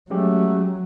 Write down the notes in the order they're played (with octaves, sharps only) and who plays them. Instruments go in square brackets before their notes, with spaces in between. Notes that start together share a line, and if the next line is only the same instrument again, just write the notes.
[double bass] F#3 [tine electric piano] G#3 C#4 G4 [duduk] A3